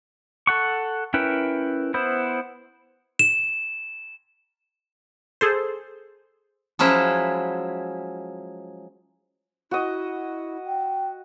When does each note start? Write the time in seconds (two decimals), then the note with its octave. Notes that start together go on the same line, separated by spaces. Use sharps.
0.47 A4 F#5 C#6
1.14 C#4 E4 A#4 B4 G5
1.94 B3 E4 C5
3.19 E7
5.41 G#4 A4 C5
6.79 F3 F#3 G#3 C#4 E4
9.71 E4 F#4 D#5
10.66 G5